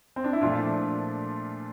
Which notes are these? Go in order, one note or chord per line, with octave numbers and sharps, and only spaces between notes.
C4
D4
E4
A#2 F3 A3 D4 F4